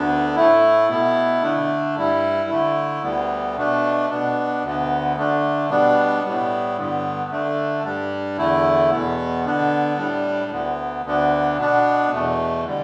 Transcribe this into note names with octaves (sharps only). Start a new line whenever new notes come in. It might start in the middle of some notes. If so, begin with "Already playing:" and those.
Already playing: D2 D3 B3 D4
A2 A3 E4
B2 B3 E4
D3 A3 D4
G2 G3 E4
D3 A3 E4
D2 D3 G3 B3
B2 A3 D4
B2 B3 D4
D2 D3 B3
D3 A3 D4
B2 G3 B3 D4
A2 G3 B3
G2 D3 B3
D3 A3 D4
G2 G3 D4
E2 D3 A3 E4
E2 B2 B3
D3 B3 D4
A2 G3 D4
D2 D3 B3
D2 D3 B3 D4
B2 B3 D4
E2 B2 A3
D3 G3